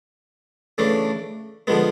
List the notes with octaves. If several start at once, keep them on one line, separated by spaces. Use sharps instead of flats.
C#3 E3 A3 D4
D3 F3 G#3 B3